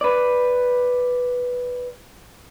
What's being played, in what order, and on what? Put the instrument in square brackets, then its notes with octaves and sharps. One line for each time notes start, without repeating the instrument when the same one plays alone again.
[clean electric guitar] B4 D5